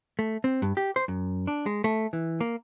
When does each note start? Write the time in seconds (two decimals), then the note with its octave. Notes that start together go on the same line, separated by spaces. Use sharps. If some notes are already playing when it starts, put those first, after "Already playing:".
0.19 A3
0.44 C4
0.62 G2
0.77 G4
0.96 C5
1.08 F#2
1.47 D4
1.66 G#3
1.84 A3
2.13 E3
2.41 A#3